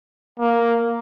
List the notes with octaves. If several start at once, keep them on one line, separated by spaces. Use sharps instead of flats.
A#3